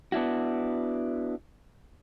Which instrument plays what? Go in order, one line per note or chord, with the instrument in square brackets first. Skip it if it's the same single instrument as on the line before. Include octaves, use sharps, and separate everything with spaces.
[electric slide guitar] B3 D4 E4 F#4